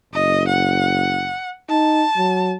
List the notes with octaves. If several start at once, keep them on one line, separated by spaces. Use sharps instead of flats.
F#1 D#5
F#5
D#4 A5
F#3